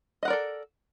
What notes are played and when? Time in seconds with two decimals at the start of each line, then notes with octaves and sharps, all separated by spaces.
0.23 D#5
0.25 F#5
0.28 A#4
0.30 D5
0.33 A4